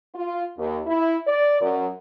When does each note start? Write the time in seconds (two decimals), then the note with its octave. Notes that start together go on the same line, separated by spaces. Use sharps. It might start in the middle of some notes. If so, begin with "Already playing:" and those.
0.14 F4
0.58 D#2
0.87 E4
1.27 D5
1.61 F#2